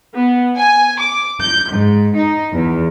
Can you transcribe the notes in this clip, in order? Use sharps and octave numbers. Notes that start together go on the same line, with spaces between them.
B3
G#5
D6
G6
G#2
D#4
E2